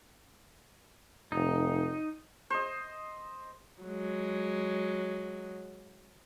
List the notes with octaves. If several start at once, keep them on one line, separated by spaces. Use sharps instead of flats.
F1 D#4
C5 D#5
F#3 G#3